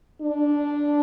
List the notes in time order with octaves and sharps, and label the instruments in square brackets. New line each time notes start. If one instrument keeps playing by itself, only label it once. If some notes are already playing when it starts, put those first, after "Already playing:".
[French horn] D4